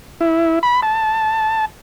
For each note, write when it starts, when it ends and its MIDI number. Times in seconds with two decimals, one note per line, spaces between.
0.21 0.59 64
0.63 0.81 83
0.83 1.65 81